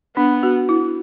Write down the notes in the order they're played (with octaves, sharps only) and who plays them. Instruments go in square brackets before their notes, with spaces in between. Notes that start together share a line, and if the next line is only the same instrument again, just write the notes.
[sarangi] B3 [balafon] D4
[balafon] F#4
E4